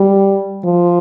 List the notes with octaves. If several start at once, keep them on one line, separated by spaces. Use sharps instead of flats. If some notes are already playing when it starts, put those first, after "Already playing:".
Already playing: G3
F3